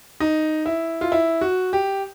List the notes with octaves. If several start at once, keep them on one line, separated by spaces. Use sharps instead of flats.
D#4
E4
F4
E4
F#4
G4